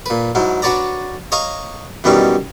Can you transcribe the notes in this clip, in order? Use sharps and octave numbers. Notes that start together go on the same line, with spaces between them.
A#2 B4
G#2 F#3 E4
D4 F#4 B4 C#5 D5 A#5
C#5 D#5 F5 A#5 C#6
F#2 B2 E3 G3 C#4 D#4